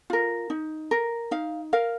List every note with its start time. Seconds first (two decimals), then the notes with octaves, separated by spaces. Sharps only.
0.10 F4 A#4
0.50 D#4
0.91 A#4
1.31 D#4 F5
1.73 A#4 F5